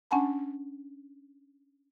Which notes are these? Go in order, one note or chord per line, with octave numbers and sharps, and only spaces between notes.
C#4 D4 F#5 G#5 A5 B5